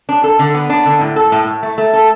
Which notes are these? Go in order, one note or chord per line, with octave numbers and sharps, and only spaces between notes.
D4
A4
D3
B3
D4
D3
A2
A4
A2
A2
A3
A3
A4